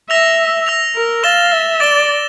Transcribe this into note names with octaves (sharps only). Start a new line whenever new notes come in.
E5 E6 A#6 F7
E6 A#6 F7
A#4
F5 A6 E7 G7
E5
D5 A6 E7 G7